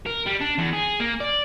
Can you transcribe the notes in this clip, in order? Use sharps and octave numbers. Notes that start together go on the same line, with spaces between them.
A#4
G3
D4
E2
G#4
A#3
D5